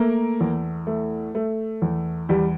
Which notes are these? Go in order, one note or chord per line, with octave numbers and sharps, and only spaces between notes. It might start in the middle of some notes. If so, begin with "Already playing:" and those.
Already playing: A3 A#3 A#4
E2
A3
A3
E2
E2 G3 G4